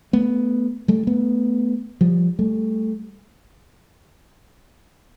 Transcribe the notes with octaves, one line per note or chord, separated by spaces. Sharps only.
A3 B3
G3 A3
A3 B3
F3 G3
G3 A3